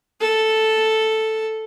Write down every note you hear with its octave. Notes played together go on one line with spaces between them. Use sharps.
A4